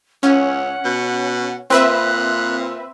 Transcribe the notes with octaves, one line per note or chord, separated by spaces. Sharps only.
C#2 C#4 F#5
B2
A#2 C4 B4 E5 F#6